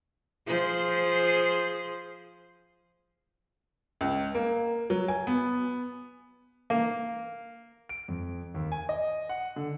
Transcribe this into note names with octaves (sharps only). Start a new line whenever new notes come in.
F3 G#4 C5
C#2
A#3
F#3
G#5
B3
A#3
D7
F2
D#2
G#5
D#5
F#5
D3